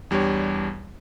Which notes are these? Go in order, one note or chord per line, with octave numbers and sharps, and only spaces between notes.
E2 G3 D4 G4 C#5